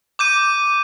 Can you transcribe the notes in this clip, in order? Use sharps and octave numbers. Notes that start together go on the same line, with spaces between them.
D6 G6 D#7